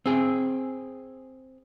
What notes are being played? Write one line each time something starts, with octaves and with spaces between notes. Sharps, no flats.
C4 G#4